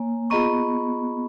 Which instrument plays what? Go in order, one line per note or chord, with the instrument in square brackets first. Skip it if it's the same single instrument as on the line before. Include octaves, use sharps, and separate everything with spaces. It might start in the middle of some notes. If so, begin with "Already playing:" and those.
Already playing: [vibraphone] A#3 [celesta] C#5 G#5
[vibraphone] B3 [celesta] F4 G#4 D#5 A#5 C#6